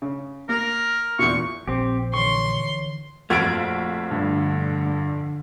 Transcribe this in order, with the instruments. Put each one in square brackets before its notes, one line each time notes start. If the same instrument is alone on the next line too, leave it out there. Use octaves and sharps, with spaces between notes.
[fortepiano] C#3
[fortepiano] A#3 [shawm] A#4
[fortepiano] E2 A#2 [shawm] C#6
[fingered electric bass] A#1 [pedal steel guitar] C4 G4
[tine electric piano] D3 E3 C#5 [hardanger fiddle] C6 [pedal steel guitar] C#6
[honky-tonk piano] A#1 F2 [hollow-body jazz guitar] A3 F4 F#4 [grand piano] G#6 A6 D7
[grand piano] G2 [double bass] D3